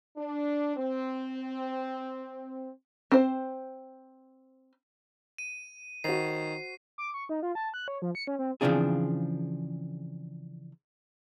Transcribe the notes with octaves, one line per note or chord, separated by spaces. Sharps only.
D4
C4
C4 C5
D#7
D#3 F#4 C5 C7
D6
C#6
D#4
F4
A5
F#6
C#5
F3
C#7
C#4
C4
C#3 E3 F3 C4 D4 G#4